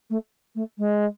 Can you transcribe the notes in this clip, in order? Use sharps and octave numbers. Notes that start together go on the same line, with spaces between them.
A3
A3
G#3